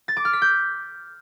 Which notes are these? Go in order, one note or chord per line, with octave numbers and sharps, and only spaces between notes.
A6
D6
F6
B6
G6